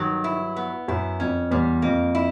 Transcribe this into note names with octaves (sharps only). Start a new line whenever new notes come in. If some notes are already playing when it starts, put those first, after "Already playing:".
Already playing: G2 D#3 F#3
E4
B3
F#2 E4
F2 C#4
E2 G3
F2 A#3
E4